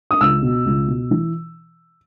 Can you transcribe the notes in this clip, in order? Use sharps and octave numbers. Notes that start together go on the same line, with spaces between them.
D#6
C#2 E6
B2
C#2
B2
E3